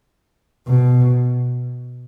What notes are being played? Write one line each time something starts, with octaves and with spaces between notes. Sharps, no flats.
B2